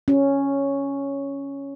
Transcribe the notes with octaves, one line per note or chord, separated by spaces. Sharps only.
C#4